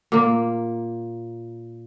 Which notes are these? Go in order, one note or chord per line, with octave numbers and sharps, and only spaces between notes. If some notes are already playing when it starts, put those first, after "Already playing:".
A#2 A#3